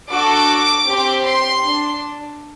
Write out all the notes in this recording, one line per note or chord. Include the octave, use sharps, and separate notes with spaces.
D4 F#4 A4 D6
C4 G4
C6
D4